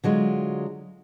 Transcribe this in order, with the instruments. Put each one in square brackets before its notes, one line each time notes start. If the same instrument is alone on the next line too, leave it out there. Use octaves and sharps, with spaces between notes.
[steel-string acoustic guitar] D3 F#3 G#3 F4